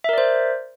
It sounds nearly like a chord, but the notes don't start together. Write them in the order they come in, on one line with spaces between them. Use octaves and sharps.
E5 A#4 D5 C5